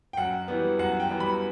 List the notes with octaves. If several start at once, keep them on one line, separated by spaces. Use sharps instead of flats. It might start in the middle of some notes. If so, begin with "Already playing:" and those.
G5
F#2 F#5
E3 G3 B3
F#2 F#5
G5
E3 G3 B3
B5